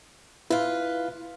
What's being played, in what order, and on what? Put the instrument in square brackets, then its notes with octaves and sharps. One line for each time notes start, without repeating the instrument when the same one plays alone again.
[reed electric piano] E4 [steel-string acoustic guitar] F4 B4